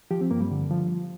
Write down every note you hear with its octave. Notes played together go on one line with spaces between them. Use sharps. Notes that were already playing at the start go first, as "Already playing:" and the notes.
F3 G4
C4
G2 A#3
G3
D3
F3